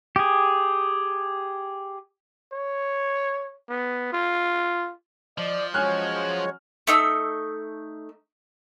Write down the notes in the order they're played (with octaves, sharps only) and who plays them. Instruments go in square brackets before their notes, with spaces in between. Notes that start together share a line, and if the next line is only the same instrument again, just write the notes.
[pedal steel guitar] G4 G#4
[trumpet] C#5
B3
F4
[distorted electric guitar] F3 [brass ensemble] D5 D#5
[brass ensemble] F#3 C#4 F#4 [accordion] G#3 C#5 [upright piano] G#5 F6 F#6
[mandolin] A3 D#4 E6